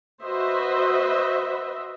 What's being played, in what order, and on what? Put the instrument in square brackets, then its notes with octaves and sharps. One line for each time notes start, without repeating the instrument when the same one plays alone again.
[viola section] F#4 B4 C5 D#5 E5